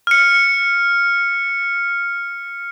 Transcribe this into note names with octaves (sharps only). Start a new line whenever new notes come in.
F6 C#7